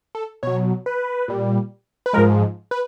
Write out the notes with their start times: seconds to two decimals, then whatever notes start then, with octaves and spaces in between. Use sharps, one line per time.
0.15 A4
0.43 B2 F#3 C#5
0.86 B4
1.28 A#2 G3
2.06 B4
2.13 G#2 F3 G#3 A#4
2.71 B4